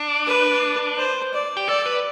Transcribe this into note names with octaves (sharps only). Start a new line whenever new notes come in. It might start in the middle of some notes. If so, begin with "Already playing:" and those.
Already playing: D4
B4
C5
D5
G4
A4 D5
B4